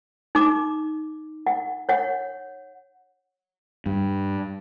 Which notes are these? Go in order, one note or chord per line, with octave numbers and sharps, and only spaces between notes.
D#4 D6
F#5
C#5 F#5
G2